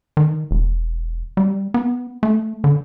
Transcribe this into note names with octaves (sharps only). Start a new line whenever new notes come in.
D#3
E1
G3
B3
A3
D3